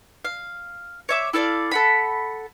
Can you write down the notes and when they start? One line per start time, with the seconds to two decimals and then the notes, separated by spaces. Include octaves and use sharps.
0.24 F5
1.09 C#5 E5 D6
1.33 E4 A4 D5 F5
1.71 A4 F#5 B5